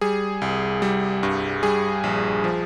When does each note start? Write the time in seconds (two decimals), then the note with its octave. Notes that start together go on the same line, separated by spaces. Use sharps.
0.01 G3 G#4
0.42 C2
0.82 G3
1.23 G2
1.63 G3 G#4
2.04 A#1
2.44 F3